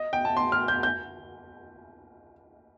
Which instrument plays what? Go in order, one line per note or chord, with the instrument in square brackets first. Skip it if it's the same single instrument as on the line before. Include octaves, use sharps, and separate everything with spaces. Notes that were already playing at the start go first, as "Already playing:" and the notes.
Already playing: [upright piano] D#5
G5
A5
C6
F6
G6
G6